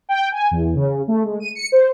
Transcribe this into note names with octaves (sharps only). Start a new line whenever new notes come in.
G5
G#5
E2
C#3
A3
G#3
D#7
C#7
C5